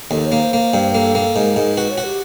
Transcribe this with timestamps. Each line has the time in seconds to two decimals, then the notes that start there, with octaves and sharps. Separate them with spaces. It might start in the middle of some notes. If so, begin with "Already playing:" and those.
0.11 D#2 A4
0.26 C#5
0.32 A#3
0.39 C5
0.53 A#3
0.74 G2
0.94 A#3 A4
1.15 A#3
1.35 G#2 A#4
1.56 G#2
1.76 F#4 B4
1.90 C#5
1.98 F#4
2.04 G4